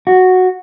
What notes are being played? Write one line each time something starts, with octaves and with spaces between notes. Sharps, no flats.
F#4